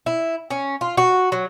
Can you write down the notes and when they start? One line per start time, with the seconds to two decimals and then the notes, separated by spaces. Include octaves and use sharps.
0.06 E4
0.50 C#4
0.81 F4
0.97 F#4
1.32 F#3